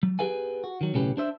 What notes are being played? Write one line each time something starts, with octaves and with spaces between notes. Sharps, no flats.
F#3
B3 G4 G#4 B4 F5 G#5
F#4
D#3 F#3
B1 A2 C#3 C#4 G4 B4
D4 C5 E5